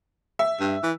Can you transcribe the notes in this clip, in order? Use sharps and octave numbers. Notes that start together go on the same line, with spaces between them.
E5
G2
E3